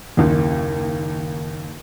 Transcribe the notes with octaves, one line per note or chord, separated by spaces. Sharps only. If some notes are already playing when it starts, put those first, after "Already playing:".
F#1 D#2